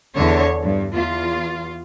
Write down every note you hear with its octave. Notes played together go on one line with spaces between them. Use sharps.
E2 D3 C#5
G2
E2 F4